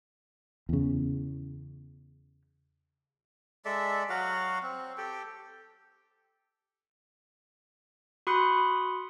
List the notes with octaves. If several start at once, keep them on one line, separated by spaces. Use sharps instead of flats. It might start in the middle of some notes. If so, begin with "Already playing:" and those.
E2 C#3
G#3 A4 D5 E5
F#3 F#4 F5 F#5
C4
G4 A4 G5
F#4 B5 C6 D#6 F#6 C#7